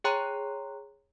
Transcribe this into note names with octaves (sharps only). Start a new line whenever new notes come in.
G#4 C#5 G5 A#5 C6 F#6